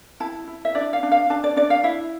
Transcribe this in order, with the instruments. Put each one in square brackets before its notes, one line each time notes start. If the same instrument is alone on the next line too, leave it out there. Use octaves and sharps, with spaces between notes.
[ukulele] E4 A5
E4
E5
D4 D5
F5
D4
F5
D4 A5
D5
D4 D5
F5
E4 E5